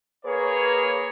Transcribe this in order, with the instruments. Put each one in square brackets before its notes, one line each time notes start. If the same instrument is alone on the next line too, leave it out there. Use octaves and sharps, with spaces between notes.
[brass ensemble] A#3 G#4 B4 C#5